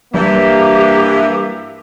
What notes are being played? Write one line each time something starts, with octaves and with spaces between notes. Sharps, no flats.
G2 E3 G3 A#3 G4